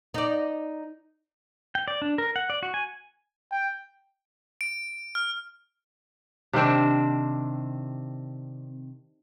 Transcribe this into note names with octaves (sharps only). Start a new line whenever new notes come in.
D#4 D5
G5
D5
D4
A#4
F#5
D5
F#4
G#5
G5
D7
F6
C3 D#3 C4 D4